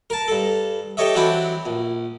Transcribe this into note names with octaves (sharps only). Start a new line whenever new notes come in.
A#4 A5
G2 A4
G4 A4 C#5 D#5 E5
E3 F#3 C4 D4 E4 G5
A#1